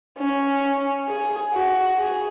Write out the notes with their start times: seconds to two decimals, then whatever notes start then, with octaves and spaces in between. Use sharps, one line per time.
0.18 C#4
1.08 G#4
1.53 F#4
1.98 G#4